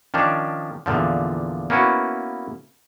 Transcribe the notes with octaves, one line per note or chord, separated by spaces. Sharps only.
D#3 F3 C#4 D4 D5
E2 A#2 D3 F3
A#3 B3 C#4 E4 F#4 B4